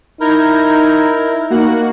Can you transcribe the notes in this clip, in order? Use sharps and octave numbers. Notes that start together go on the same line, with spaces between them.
D#4 E4 A#4 A#5 G6 G#6
A#3 D#4 F#4 F#5